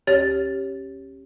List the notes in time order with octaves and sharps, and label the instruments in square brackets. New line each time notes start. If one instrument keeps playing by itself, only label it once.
[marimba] D2 G4 C#5 A6